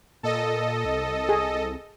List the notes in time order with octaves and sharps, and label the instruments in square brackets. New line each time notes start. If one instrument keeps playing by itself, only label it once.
[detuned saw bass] A#2 [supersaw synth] A4 D#5
[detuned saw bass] C2
[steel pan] G#4